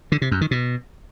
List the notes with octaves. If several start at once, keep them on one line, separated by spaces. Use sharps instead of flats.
D3
C3
F#2
D#3
B2